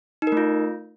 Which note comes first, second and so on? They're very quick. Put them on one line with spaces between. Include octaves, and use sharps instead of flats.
D#4 A#4 A3 F4